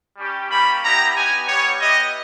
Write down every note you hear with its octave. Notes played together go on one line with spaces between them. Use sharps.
G3 C#4 G4
G3 A#3 C#4 G4 B5
G3 B3 E4 G4 A#5
B3 D#4 G4 G#5
G3 B3 G4 C#5
B3 E4 G4 D#5